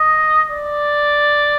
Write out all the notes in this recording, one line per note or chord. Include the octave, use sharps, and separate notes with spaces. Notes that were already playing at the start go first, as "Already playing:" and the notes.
Already playing: D#5
D5